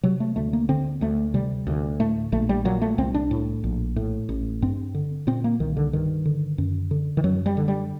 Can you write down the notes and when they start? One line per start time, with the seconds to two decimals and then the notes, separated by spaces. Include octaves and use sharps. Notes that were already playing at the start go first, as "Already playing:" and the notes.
0.03 C3 F#3
0.20 A3
0.36 D2 A3
0.53 A#3
0.69 D3 C4
1.01 D2 A3
1.34 C3 G3
1.67 D2
2.00 A2 A3
2.32 A#1 A3
2.49 G3
2.65 A#2 F#3
2.82 A3
2.98 C2 C4
3.14 D4
3.31 A2
3.64 A#1
3.96 A2
4.29 A1
4.62 G2 C4
4.94 D3
5.27 A#2 C4
5.44 A#3
5.60 C2 D#3
5.77 D3
5.93 G2 D#3
6.26 D3
6.58 F#2
6.91 D3
7.17 D#3
7.24 F#2 F#3
7.46 G3
7.57 D3
7.68 G3